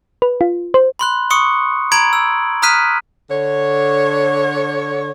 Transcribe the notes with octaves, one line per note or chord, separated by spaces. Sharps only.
B4
F4
C5
B5 C6 F#6
C6 C#6 D#6 C#7
A#5 B5 G#6 D7 F#7
E6
A#5 D#6 F6 F#6 B6 D#7
D3 C#5